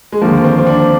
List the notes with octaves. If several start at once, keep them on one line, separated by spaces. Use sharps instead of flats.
G#3
D#2 D3 F3 A#3
C4
C4
D4